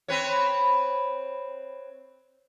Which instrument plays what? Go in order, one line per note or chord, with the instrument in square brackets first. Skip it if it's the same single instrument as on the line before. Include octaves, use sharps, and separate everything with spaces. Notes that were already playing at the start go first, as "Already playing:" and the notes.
[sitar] C4 B4 C#5